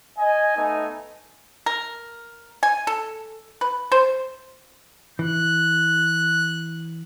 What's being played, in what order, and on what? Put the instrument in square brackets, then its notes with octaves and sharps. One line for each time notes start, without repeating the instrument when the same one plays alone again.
[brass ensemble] D#5 G#5
A3 B3 D#4 G#5
[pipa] A#4
G#5
A4
B4
C5
[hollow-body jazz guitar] E3 [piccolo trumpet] F#6